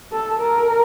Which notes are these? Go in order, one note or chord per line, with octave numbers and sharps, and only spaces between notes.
A4
A#4